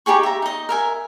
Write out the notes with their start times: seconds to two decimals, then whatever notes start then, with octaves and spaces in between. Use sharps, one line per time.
0.06 D#4 G4 G#4 C#6
0.23 E5 A#5
0.42 D#4 D#5
0.69 A#4 E5 G#5